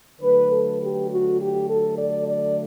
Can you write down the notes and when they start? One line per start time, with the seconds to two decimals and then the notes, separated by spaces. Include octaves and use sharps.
0.21 D3 F#3 A3 B4
0.51 A4
0.80 G4
1.09 F#4
1.39 G4
1.68 A4
1.97 D5
2.27 D5